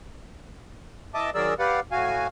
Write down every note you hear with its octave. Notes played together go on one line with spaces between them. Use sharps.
E3 D#5 E5 A5 D6
D#3 F#3 G#4 A#4 D5 E6
G4 B4 D5 F5 F#5
A2 F#4 F5 G#5